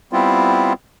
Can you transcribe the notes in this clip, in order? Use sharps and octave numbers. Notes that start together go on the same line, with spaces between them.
G3 B3 C4 E4 F4